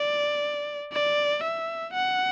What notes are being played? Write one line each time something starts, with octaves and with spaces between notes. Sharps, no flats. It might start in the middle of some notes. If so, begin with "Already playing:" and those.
Already playing: D5
D5
E5
F#5